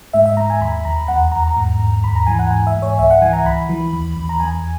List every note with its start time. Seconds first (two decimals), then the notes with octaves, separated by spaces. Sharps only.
0.13 G#2 E5
0.26 E5
0.37 G#2 A#5
0.50 G#5
0.61 D#2 B5
0.85 D#2 A#5
1.08 E2 F#5
1.32 E2 A#5
1.44 A#5
1.57 G#2
1.80 G#2
2.04 D#2 B5
2.16 A#5
2.26 E3 G#5
2.39 F#5
2.50 G#2 G#5
2.67 E5
2.75 G#2
2.82 C#5
2.99 C#2 E5
3.11 F#5
3.22 E3 G#5
3.33 A#5
3.45 C#2 B5
3.69 E3
3.93 D#2
4.17 D#2
4.29 A#5
4.40 E2 G#5